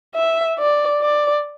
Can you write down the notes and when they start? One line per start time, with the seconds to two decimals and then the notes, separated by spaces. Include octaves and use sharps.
0.15 E5
0.59 D5
1.01 D5